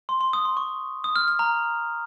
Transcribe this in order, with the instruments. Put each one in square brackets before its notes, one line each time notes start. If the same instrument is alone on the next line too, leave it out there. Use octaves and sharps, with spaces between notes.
[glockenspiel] C6
C6
D#6
C6
C#6
D#6
F6
F6
A#5